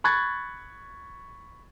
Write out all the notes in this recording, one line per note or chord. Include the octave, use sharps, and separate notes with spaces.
B5 C#6 F#6 G#6 A6